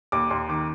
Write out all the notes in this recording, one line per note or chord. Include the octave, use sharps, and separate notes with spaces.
D#2 D6
D#2 C6
D#3 D6